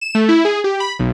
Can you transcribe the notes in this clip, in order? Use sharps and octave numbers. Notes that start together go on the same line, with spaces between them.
E7
A3
E4
G#4
G4
B5
B1